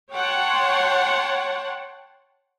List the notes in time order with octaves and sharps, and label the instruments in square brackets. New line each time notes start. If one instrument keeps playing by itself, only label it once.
[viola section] C#5 F#5 G5 A5 C6